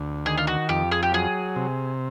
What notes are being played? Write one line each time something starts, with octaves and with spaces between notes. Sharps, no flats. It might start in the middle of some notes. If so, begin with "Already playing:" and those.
Already playing: D2
D#3 G#4
F4
F#4
F2 G4
G#4
G4
F#3 G#4
C3